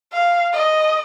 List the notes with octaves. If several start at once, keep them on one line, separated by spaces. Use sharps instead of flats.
F5
D#5